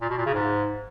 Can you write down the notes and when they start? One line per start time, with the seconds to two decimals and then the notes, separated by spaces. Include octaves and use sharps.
0.01 A#2
0.10 B2
0.18 A#2
0.26 C#3
0.34 G#2